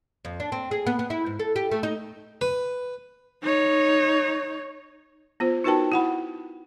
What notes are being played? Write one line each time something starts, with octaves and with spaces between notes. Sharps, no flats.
F2
D4
C4
G#4
B3
B3
E4
G#2
A4
G4
A3
D#4
B4
D#4 C#5
B3 F4 C5
D#4 F#4 A#4 B4 G5 A5
E4 F#5 B5